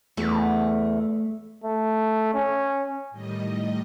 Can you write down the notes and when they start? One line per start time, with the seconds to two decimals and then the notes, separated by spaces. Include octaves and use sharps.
0.17 E2 A3
1.64 A3
2.34 C#4
3.10 A2 D#3 G3 D#5